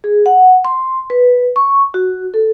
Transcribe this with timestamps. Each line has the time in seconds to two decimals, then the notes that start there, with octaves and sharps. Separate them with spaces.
0.04 G#4
0.26 F#5
0.65 C6
1.10 B4
1.56 C#6
1.94 F#4
2.34 A4